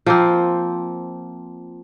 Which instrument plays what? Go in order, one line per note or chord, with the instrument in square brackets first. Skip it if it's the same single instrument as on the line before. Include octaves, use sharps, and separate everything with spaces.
[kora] F3 A#3 C4